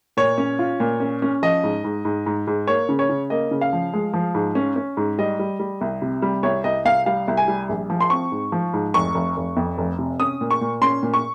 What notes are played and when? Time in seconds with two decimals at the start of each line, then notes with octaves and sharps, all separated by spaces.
0.17 A#2 C#5
0.38 C#4
0.59 F4
0.80 A#2
1.00 C#4
1.22 C#4
1.43 F3 D#5
1.64 G#2
1.84 G#2
2.05 G#2
2.26 G#2
2.47 G#2
2.67 A#3 C#5
2.89 C#3
2.99 C#5
3.09 C#3
3.30 A#3 D#5
3.51 C#3
3.61 F5
3.73 F3
3.93 G#3
4.13 F3
4.35 G#2
4.55 C#4
4.76 C#4
4.97 G#2
5.18 G3 D#5
5.39 G3
5.60 G3
5.81 C2
6.02 C3
6.22 G3
6.43 C2 C#5
6.64 C2 D#5
6.85 C2 F5
7.06 G3 F5
7.28 C2
7.37 G#5
7.48 G3
7.69 A#1
7.90 F3
8.01 C6
8.10 C4 C#6
8.32 G#2
8.52 F3
8.73 G#2
8.94 F1 C#6
9.14 F1
9.37 F1
9.57 F2
9.78 F1
9.99 C3
10.20 C#4 D#6
10.41 A#2
10.51 C#6
10.61 A#2
10.82 C#4 C6
11.03 A#2
11.14 C#6